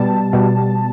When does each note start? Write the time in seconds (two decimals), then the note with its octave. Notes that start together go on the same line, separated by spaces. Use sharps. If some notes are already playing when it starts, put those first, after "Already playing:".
Already playing: B2 G3 A5
0.33 B2 G3